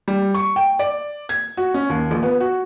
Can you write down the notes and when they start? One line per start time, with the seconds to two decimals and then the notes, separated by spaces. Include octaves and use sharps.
0.08 G3
0.35 C#6
0.56 G5
0.79 D5
1.29 G#6
1.57 F#4
1.74 C#4
1.90 D#2
2.11 A#1
2.23 B3
2.40 F#4